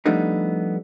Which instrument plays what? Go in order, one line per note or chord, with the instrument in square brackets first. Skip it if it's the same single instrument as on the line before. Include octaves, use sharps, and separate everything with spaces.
[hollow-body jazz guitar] F3 G3 A3 B3 D4 D#4